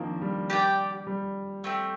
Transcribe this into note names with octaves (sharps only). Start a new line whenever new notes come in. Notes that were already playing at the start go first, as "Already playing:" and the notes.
Already playing: D#3 F3 A#3 C4 D4
G3
G4 D5 G5
G3
A3 C4 G4